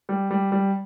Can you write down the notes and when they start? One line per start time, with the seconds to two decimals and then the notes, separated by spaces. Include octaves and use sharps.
0.09 G3
0.30 G3
0.52 G3